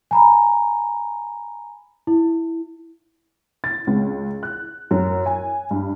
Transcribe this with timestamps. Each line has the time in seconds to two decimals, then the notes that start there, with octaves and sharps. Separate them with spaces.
0.11 G#5 A#5 B5
2.07 E4
3.64 A6
3.87 C#2
4.43 F#6
4.91 F#2
5.26 G#5
5.71 G2